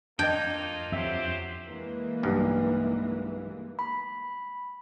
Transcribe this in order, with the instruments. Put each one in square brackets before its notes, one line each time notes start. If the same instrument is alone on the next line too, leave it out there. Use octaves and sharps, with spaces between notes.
[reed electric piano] F2 G#6 [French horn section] A#3 D#4 F4 [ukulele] D4 D#5 [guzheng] G5
[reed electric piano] F2 E5 [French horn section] F#3 G4 C5
[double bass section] E3 G#3 A#3
[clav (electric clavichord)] B1 G2
[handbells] B5